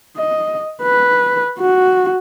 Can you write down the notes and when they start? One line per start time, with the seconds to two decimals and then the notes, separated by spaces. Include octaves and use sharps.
0.17 D#5
0.83 B4
1.59 F#4